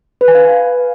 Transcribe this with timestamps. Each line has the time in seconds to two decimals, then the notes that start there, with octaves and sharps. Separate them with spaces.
0.21 B4
0.28 G#5
0.35 F5